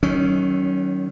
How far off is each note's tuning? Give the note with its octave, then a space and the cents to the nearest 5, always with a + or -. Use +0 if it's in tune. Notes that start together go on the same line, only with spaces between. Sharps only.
D#3 +0 F#3 +25 C#4 +0